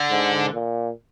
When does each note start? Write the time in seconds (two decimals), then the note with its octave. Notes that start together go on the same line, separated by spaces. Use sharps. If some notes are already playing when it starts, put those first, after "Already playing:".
Already playing: D3
0.11 G#2
0.53 A#2